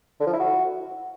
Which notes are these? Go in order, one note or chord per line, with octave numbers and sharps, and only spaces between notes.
D3
F3
E4
F#4